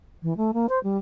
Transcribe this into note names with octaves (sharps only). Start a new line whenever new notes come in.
E3
A3
A#3
C5
G3